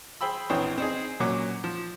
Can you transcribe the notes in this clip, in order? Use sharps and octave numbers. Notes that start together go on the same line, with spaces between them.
G#4 C5 G5 B5 E6
A#1 E3 C4 C#5 G5 D#6
C4 D#4 G#4
A#2 F#3 C#4 D6
F3